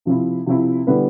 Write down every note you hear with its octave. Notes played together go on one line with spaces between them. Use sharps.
C3 F3 C4 E4
C3 F3 C4 E4
D3 G3 B3 E4 B4